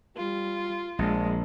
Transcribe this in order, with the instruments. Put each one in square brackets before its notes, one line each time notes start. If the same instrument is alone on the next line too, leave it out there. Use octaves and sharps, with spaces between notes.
[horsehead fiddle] G3 [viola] F4
[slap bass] A#1 [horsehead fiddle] G#3